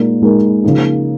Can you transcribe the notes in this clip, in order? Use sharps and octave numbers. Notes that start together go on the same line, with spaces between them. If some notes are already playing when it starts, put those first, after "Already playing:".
Already playing: A#2 G#3 D#4 A#4
A#2 G#3 D#4 A#4
C#3 F3 A#3 D#4